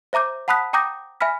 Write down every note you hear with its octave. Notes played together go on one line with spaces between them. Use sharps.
C5 E5 A#5 D6 G6
F#5 A5 B5 D#6 F#6 B6
G5 A#5 D6 D#6 G6 A#6
E5 G#5 B5 F6 B6